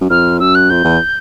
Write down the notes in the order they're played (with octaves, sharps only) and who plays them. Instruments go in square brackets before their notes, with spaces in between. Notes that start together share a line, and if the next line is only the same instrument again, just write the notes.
[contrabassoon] F#2
[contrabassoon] F2 [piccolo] F6
[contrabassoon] F#2 [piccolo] E6
[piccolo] F#6
[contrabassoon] F2 [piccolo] G6
[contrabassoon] E2